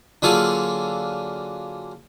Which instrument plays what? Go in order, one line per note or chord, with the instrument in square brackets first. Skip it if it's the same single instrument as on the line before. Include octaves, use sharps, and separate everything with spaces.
[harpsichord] D3 F#3 A#3 F4 G#4 A4